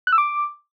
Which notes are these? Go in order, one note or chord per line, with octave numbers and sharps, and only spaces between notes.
F#6
E6
D6